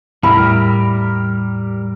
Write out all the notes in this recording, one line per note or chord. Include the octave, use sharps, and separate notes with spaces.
E2 A2 G3 E4 G4 A#4 B5